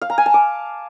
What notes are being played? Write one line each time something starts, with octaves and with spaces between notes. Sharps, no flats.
F5
A#5
G#5
A5
D6